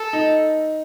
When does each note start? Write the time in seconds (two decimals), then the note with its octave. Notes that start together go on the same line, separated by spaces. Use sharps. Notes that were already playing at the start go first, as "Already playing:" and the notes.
Already playing: A4
0.13 D#4